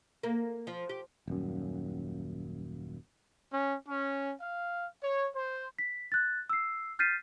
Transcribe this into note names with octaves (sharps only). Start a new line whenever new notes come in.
A#3
F3
G4
D#1 F#2
C#4
C#4
F5
C#5
C5
B6
F#6 A6
E6 C7
F6 G6 A6 B6 C7 D#7